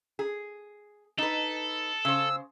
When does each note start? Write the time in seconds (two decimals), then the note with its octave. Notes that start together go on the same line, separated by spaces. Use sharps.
0.19 G#4
1.18 D#4 A4 B4
2.05 C#3 C5 E6